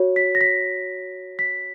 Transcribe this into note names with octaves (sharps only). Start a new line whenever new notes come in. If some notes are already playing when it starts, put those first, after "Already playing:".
Already playing: F#4 C#5
B6
A#6
B6
B6